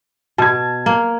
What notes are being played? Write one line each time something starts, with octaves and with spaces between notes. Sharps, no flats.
B2 A5 G#6
A#3